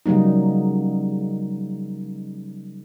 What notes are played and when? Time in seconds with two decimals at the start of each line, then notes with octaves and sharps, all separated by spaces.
0.06 C#3 F#3 G3 A#3 D#4